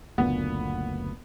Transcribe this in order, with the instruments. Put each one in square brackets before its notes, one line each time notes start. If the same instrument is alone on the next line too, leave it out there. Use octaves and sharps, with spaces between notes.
[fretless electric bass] F#1 D2 A#2 [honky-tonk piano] B3